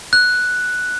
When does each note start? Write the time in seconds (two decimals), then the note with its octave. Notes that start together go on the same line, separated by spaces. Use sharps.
0.13 F#6